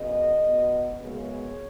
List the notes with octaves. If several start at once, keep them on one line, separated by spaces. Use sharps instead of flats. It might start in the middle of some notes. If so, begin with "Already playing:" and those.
Already playing: F#2 C#3 B3 D#5
B2 B3
F#2 C#3 G#3 B3 C#5